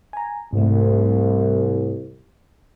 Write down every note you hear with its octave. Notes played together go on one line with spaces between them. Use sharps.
G#5 A#5
C2 G#2 A3